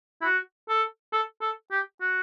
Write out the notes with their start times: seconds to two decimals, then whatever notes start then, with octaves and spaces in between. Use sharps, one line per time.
0.22 E4
0.25 F#4
0.69 A4
1.13 A4
1.41 A4
1.71 G4
2.01 F#4